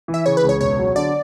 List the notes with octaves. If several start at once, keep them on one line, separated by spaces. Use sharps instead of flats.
E3
E5
C#3 C#5
B4
C#2
C#5
E1 C#5
F#3
D3 D5